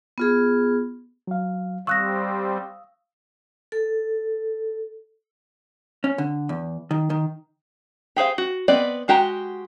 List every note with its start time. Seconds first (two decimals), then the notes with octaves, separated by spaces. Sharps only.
0.18 B3 F4 G#4
1.27 F#3 F5
1.87 G3 C4 F5 C#6 D#6 E6 F#6 A#6
3.72 A4
6.04 C#4
6.18 D3
6.49 E2
6.91 D#3
7.10 D#3
8.16 G4 G#4 C5 F5
8.38 F#4
8.68 B3 C4 B4 D5 D#5
9.08 G#3 F#4 G4 G5 A#5